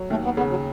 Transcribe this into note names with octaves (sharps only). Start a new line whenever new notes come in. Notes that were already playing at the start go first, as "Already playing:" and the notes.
Already playing: F#3
D#2 A3
B3
C#3 B3
F#3